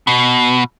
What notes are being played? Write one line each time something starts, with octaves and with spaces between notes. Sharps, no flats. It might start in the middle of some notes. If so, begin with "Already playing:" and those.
B2